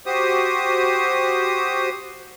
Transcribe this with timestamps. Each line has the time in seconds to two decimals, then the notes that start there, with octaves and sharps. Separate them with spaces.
0.06 F#4 G4 C5 D#6